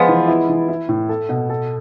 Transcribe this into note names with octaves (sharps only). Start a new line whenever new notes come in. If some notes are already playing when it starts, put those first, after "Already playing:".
Already playing: F3 G#3 B3 F4
E3
E4
E3
E4
A2
A4
B2
A4